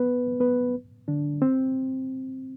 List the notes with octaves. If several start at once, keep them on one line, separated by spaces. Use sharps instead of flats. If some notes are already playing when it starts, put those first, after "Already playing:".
Already playing: B3 B4
B3 B4
D3 D4
C4